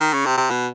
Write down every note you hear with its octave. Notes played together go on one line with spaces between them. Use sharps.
D#3
C#3
C3
C3
B2